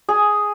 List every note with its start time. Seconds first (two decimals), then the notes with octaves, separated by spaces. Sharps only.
0.09 G#4